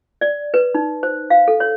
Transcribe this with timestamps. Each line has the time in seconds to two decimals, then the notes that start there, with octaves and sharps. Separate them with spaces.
0.21 D5
0.54 B4
0.75 D#4
1.03 C5
1.30 F5
1.48 A4
1.60 C#5